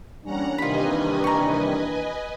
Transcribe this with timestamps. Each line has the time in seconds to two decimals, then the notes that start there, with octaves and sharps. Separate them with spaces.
0.24 E3 G3 A#3 C#4 D4 F#5 A#5
0.58 C3 D#3 G3 F4 B4 D#5 G#5 B5
1.24 A#5 C#6